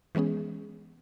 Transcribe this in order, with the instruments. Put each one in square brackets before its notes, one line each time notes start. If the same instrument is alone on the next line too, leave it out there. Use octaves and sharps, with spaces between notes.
[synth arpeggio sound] E3 G#3 B3 C#4 G#4